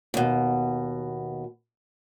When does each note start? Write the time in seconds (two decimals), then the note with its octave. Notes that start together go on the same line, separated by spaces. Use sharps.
0.14 D#2 B2